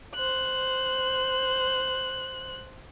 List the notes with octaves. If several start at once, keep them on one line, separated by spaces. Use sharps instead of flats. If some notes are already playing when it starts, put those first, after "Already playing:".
C5 F#6